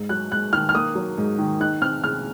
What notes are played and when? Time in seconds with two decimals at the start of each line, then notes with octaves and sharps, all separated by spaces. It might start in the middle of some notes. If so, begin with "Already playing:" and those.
Already playing: G#2
0.09 F#3 F#6
0.31 G#2 F#6
0.53 D#3 F6
0.69 F6
0.74 A#3 D#6
0.95 F#3
1.17 G#2
1.38 D#3
1.60 D#4 F#6
1.82 C4 F6
2.03 C#3 F6